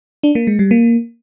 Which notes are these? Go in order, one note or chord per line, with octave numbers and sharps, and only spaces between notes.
D4
A#3
G#3
G3
A#3